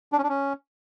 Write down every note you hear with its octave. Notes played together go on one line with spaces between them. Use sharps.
D4
C#4
D4
C#4